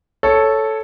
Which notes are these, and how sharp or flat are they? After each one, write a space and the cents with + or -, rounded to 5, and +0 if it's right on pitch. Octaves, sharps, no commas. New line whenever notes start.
A4 -5 C#5 +0